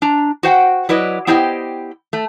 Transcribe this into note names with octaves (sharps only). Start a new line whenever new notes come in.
D4 A#5
F#4 C5 F#5 G5
F#3 E4 B4 D5 D#5
B3 E4 G4 C5 D#5 G5
A3